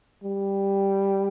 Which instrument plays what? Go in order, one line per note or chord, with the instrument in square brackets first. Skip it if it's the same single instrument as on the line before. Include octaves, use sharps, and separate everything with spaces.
[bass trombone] G3